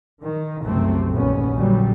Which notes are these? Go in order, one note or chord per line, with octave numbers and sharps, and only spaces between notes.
D#3
F#1 C2 F#2 C3 A3 C4
A#1 D#2 B2 B3 C#4
A#2 D3 F#3 G3